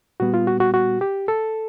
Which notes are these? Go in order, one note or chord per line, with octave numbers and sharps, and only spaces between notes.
A#2 G3 B3 F#4
F4
F#4
F#4
F#4
G4
A4